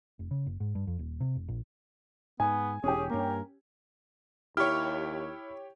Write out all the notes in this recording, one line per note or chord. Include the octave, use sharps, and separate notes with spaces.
F1
C#3
F#1
G#2
G2
F2
D#1
C3
F1
A#1
G#2 B3 G#5
E1 C#4 G4 G#4
G2 A#3 A#4
D#2 E4 G4 C#5 C#6 F6